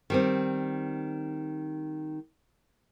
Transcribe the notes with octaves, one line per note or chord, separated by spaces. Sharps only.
D#3 G3 C4